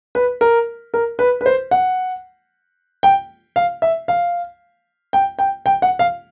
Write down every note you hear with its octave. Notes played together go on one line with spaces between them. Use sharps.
B4
A#4
A#4
B4
B4
C5
F#5
G5
F5
E5
F5
G5
G5
G5
F#5
F5